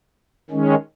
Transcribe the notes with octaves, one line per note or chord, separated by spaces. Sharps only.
D#3 G#3 C#4